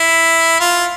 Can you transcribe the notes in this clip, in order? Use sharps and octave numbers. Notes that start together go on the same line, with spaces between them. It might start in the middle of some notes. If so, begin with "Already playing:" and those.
Already playing: E4
F4